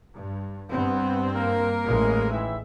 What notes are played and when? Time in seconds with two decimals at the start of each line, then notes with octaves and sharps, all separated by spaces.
0.14 G2
0.71 G2 B3 C4
1.34 A#3 A#4
1.86 A1 G#3
2.30 D#3 E3 E5